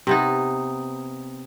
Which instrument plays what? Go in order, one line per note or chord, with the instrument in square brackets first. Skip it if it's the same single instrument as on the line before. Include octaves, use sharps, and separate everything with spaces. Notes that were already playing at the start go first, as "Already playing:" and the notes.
[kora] C3 B3 D#4